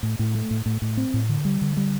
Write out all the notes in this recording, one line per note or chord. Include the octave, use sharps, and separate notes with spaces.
A2
A2
A3
A2
A2
A2
C4
A2
D3
G3
D3
G3